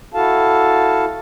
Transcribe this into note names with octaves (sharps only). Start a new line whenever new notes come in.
E4 F#4 A4 F5 A5